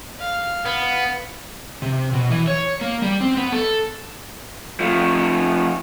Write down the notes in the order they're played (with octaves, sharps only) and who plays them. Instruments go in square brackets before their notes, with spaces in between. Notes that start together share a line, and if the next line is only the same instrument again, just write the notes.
[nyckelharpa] F5
[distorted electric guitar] B3
[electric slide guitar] C3
B2
E3
C#5
A#3
G3
C4
B3
A4
[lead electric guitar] F3 A3